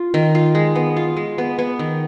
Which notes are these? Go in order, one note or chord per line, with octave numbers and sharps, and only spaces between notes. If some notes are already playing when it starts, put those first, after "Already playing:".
Already playing: F4
D#3
F4
G#3
B3
F4
G#3
B3
B3
D#3